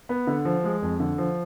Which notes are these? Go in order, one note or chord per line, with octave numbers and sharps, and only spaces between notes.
B3
D3
F3
G#3
F2
D3
F3